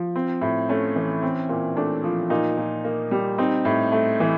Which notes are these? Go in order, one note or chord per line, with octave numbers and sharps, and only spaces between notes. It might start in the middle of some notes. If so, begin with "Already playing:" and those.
Already playing: F3
C4
A2
A3 C#4
E3
C4
A#2
A3 D4
F3
A#2 D#4
A#2
A#3
G3
C4 D#4
A2
A3
E3